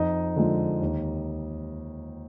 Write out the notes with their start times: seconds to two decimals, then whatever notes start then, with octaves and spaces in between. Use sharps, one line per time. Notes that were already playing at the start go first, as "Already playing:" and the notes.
Already playing: F2 D#4 D#5
0.36 D3 F3 G#3
0.81 D#2